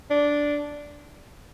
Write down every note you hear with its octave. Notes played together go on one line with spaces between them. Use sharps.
D4